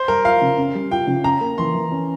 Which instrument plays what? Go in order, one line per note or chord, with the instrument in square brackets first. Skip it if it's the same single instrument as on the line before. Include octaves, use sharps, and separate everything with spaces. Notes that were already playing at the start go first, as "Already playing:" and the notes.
Already playing: [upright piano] C5
[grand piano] G3 [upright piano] A#4
[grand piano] F4 [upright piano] F5
[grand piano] C#3
C#4
G3
[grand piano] F4 [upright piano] G5
[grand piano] C#3
[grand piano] C#4 [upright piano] A#5
[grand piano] A#3
[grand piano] E3 [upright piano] C6
[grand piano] E3
C#4